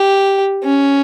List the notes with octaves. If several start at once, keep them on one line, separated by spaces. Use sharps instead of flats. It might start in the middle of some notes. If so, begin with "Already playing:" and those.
Already playing: G4
C#4